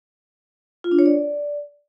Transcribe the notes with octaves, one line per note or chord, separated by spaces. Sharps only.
F4
D4
C#5
D5